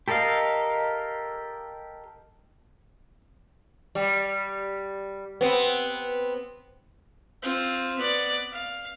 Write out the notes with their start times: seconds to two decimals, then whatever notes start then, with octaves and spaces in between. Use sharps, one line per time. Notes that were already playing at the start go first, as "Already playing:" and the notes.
0.08 G4 A4 A#4 D#5 F5
3.95 G3
5.41 B3 C4
7.42 C4 F4
7.98 B3 D5
8.52 F5